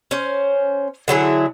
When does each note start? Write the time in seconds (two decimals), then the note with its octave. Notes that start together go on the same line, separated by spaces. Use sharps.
0.11 C#4 C5
1.08 D3 F#3 E4 G#4